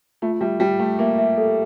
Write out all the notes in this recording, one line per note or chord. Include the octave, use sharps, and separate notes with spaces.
A3 F4
G3 E5
G3 G5
A3 G5
A#3 E5
E5
A4